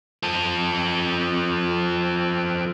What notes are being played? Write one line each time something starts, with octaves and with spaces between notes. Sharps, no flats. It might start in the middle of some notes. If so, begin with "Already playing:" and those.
F3 A4